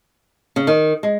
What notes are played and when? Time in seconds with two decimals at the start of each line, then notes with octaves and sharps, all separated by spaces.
0.56 C#3
0.67 D#3
1.03 G#3